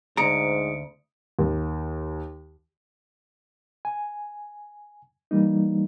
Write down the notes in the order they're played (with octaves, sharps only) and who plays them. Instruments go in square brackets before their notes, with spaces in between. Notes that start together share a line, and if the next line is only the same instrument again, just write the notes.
[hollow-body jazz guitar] D2 A#5 [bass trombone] G#2 [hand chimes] D#6 C#7 D7
[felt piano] D#2
[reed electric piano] G#5
E3 G3 A#3 D#4